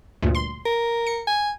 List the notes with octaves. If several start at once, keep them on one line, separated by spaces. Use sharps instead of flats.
D2 G2 A#2
C6
A#4
C#7
G#5